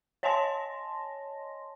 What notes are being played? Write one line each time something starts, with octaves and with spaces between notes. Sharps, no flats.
C#5 D#5 G#5 A5 C6 A#6